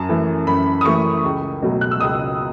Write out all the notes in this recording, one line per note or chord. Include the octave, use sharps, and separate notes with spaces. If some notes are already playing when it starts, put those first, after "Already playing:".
Already playing: F#2 A5
E3 A3
F#2 B5
D#6
E3 A3 C#6
C#2
B2 F#3 A3
F#6
E6
C#2 D#6